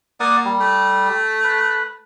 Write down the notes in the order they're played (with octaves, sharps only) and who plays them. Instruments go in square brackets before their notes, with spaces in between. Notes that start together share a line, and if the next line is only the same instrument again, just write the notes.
[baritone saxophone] A#3 [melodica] D5 F#5 D#6
[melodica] G3
[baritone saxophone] A3
[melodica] B4